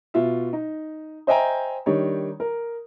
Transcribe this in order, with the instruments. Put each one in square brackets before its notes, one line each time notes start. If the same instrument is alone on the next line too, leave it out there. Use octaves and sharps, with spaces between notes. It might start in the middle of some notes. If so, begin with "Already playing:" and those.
[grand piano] B2 F4 E5
D#4
C5 D#5 E5 G5 G#5 A#5
D#3 G3 D4 D#4 C#5
A#4